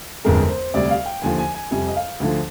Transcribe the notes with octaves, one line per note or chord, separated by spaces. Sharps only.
G1 F2 D3 G#3 A#4
C5
D2 C3 G3 D5
F5
G5
D#2 D3 F3 G#5
G#5
G#5
F2 C3 G3 G#5
D#5
F5
D2 D3 F3